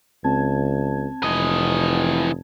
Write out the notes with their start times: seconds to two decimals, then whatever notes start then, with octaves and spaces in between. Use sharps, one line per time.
0.24 C#2 C4 A5 G#6
1.23 F1 E3 D#5